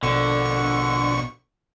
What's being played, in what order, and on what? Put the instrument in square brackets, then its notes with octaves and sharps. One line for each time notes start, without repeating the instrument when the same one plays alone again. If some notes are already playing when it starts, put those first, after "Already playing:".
[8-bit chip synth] A#1 B2 C#6 [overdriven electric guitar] D3